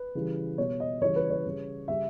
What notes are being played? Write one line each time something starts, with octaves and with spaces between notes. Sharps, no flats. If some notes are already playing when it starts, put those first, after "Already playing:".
Already playing: B4
C#3 E3 G3
B2 G3 C#5
D#5
C#3 E3 G3 C#5
B4
C#5
C#3 G3
C#3 G3 E5